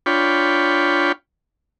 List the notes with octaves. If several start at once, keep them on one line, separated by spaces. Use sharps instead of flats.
D4 F4 C#5 G5 B5